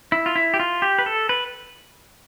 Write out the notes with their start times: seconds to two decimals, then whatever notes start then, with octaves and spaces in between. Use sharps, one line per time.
0.12 E4
0.26 F4
0.36 E4
0.54 G4
0.60 F4
0.82 G4
0.99 B4
1.06 A4
1.29 B4